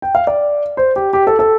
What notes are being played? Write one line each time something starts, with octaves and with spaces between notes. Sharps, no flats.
G5
F5
D5
C5
G4
G4
A4
A4